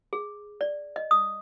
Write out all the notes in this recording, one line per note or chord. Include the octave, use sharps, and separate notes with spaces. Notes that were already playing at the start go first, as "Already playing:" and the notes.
G#4
D5
D#5
D#6